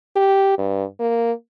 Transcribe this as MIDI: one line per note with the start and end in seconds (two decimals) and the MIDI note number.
0.16 0.56 67
0.58 0.84 43
0.99 1.32 58